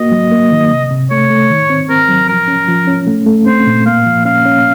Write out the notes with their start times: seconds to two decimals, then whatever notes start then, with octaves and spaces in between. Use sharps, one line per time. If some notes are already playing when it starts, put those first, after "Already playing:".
Already playing: A#3 F#4 D#5
0.12 F#3
0.32 A#3
0.52 D#3
0.71 C3
0.91 C3
1.10 A3 C#5
1.30 A3
1.50 D#3
1.70 C4
1.89 C4 A#4
2.09 F#3
2.29 F3 A#4
2.48 C#4
2.68 F3
2.87 C#4
3.07 A3
3.26 A3
3.46 C4 C5
3.67 A#2
3.86 A#3 F5
4.06 F3
4.25 C#4 F5
4.45 C#4